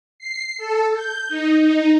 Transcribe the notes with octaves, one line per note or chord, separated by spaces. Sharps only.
C7
A4
G6
D#4
D#4